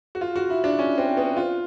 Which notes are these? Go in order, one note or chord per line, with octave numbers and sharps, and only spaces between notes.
F#4
F4
F#4
E4
D4
C#4
C4
B3
F4